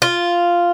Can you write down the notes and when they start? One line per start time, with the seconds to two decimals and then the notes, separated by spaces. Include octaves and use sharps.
0.02 F4